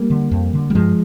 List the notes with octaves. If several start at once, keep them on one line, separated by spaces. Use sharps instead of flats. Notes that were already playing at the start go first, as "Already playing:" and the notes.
Already playing: G3 A#3
D3
F2
D3
G3
G2 F3 G#3